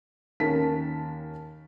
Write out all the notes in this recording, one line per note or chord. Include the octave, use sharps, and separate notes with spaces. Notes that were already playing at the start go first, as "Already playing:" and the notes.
D#2 C#4 A#4 A5 B6